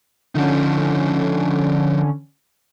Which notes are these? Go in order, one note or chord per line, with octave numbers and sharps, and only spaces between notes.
D3 F3 C#4 D#4